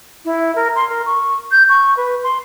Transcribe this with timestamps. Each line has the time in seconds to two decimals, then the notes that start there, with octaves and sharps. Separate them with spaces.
0.25 E4
0.55 A#4
0.76 C6
0.89 A#4
1.06 C#6
1.51 G6
1.69 C#6
1.97 B4
2.23 C6